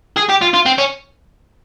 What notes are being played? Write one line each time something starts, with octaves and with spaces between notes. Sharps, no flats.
G#4
G4
F4
F4
C4
C#4